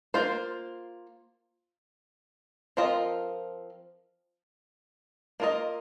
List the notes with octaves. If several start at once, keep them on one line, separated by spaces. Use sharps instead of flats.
A#3 F4 C5
F3 C4 F4 A#4 D#5
A#3 F4 A#4 D#5